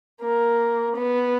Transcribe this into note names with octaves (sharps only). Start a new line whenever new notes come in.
A#3
B3